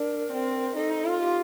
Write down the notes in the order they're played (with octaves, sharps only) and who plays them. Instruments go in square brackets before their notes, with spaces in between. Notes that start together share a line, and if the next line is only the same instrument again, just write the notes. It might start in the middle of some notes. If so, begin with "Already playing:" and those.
Already playing: [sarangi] D4 [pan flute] A#4
[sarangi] C4
[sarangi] D#4 [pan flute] A4
[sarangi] F4
[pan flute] G4